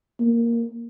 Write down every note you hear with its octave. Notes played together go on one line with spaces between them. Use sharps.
A#3